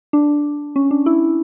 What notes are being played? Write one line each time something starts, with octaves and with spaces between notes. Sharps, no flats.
D4
C#4
D4
E4